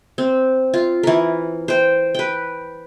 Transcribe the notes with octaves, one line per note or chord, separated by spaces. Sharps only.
C4
F4
E3 A#4
C5 G5
B4 G5